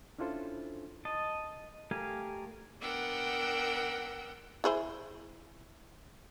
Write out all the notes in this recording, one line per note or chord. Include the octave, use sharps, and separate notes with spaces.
C#4 D4 E4 F4 A4 C5
D#5 A5
A3 G4 A#4 F5 G#5
B3 D4 A#4 F#5 G5 E6
E4 G#4 C5